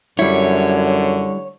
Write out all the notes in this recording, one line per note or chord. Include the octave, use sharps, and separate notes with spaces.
F#2 D3 G3 E4 C#5